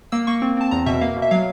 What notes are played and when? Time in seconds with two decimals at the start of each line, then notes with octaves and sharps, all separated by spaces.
0.12 A#3 E6
0.27 A#3 C#6
0.42 C4
0.57 C4 A5
0.71 E2 A#5
0.86 B2 E5
1.01 A#3 F5
1.16 B2
1.22 E5
1.31 F#3 F5